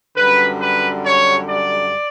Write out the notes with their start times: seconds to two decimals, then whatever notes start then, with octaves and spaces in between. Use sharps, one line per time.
0.16 F#2 D3 G3 B4
0.60 B4
1.04 C#5
1.49 D5